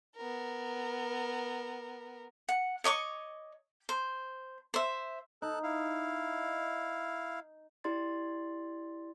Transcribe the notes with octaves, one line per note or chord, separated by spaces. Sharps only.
B3 A#4
F#5
C#5 D#5 C#6 D6
C5
C5 E5
D#4 A4 F#6
E4 F5
E4 G4 D5 C6 A6